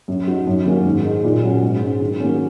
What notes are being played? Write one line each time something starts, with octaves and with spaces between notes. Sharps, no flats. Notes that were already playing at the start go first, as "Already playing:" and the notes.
F#2
F#3 D#4
F#2
D#3 F#3 A#3 C#4
G#2
G#3 D#4
A#2
F#3 C#4
G#2
G#3 C#4
D#3
F#3 A#3 C#4